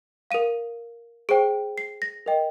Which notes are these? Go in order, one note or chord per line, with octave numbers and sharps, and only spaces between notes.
A#4 F5 D#7
G#4 C5 G5 D7
C7
A#6
A#4 D#5 G5